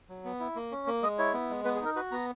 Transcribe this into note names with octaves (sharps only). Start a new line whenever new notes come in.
F#3
B3
E4
A#3
C#4
A#3
G#3 D#5
E4 C#5
B3
G#3
B3 B4
G#4
D#4 A#4
F#4 B4
B3 A#5